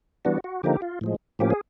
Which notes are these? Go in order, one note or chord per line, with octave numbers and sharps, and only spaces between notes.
E3 G3 B3 D4 F#4
F#4
D3 F3 A#3 D#4 G4
F4
A2 F3 G#3
A2 F3 A#3 C#4 G4
G#4